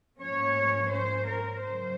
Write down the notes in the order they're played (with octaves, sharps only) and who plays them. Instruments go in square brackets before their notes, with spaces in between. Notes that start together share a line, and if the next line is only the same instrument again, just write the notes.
[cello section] G#2 F3 A#3 C#4 C#5
C5
A#4
F#2 C#3 F#3 C5